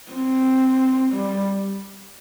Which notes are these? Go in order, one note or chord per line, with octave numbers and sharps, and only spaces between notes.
C4
G3